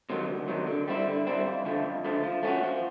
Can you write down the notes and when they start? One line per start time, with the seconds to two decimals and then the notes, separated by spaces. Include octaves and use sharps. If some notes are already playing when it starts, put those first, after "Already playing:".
0.10 C3 D#3 F#3
0.29 D2
0.48 C3 D#3 F#3
0.67 D3
0.88 G3 C4 E4
1.07 D3
1.27 G3 C4 E4
1.45 F2
1.65 D3 F3 A3
1.84 F2
2.05 D3 F3 A3
2.24 F3
2.43 A3 C#4 F#4
2.63 F3